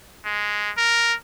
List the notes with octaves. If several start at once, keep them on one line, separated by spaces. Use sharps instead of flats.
G#3
A#4